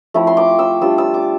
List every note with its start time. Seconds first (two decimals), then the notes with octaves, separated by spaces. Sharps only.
0.14 F3 A3 C4 E4
0.27 C6
0.37 D6
0.59 E6
0.81 G3 D4 F4 E6
0.98 E6
1.14 D6